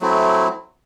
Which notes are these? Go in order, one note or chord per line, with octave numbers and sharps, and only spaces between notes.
F#3 A3 C4 E4